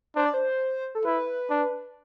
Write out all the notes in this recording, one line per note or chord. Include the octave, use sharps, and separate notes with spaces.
D4 C5
D5
C5
A4
E4 B4
D4